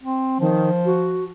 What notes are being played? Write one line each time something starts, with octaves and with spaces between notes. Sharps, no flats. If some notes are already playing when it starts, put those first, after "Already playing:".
C4
D#3 F3
F#4